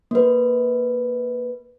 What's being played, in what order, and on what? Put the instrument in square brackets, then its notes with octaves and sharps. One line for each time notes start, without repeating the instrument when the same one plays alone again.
[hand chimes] A#3 B4